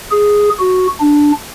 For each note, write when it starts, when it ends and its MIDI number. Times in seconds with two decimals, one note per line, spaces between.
0.11 0.49 68
0.59 0.87 66
1.00 1.32 62